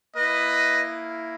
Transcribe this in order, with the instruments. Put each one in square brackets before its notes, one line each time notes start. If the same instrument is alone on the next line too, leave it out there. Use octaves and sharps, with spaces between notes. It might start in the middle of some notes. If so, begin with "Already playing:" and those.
[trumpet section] A#3 E4 B4 D#5